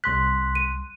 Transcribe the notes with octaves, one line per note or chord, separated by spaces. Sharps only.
C2 C6 F#6 B6
D#7